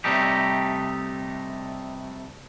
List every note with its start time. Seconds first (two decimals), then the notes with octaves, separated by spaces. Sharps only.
0.04 C3 G3 A3 D#4 G4